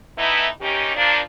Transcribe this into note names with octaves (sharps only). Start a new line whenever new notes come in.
E3 A3 B3 D#4 E4
C3 D#3 C#4 D#4 G4
F3 A#3 D4